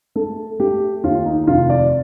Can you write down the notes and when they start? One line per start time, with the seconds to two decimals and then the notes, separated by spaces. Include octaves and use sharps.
0.16 A3 A4
0.60 A3 G4
1.03 D#2 F4
1.25 D#4
1.47 F1 F4
1.70 D5